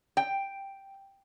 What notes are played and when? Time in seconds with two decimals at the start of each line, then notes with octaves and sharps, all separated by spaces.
0.17 G5